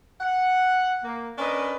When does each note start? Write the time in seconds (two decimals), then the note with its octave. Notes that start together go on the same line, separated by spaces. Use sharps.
0.21 F#5
1.04 A#3
1.38 C#4 D4 A#4 B4 D#5